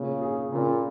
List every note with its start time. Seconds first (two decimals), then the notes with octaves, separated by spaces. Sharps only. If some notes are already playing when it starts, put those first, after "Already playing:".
Already playing: A#2 C#3
0.22 G#4
0.52 A#2 C#3